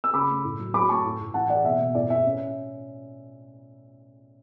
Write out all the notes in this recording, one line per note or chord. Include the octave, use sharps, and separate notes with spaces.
E6
C#3 B5 D6
A3
A2
F#3
F#3 B5 D6
A3 A5 C#6
A2
A2
E3 F#5 A5
E3 D5 F#5
B2 E5
B2
A2 D5
A2 E5
C#4